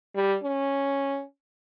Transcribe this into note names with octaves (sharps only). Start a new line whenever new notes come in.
G3
C#4